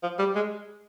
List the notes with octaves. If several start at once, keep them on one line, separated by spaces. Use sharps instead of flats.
F3
G3
G#3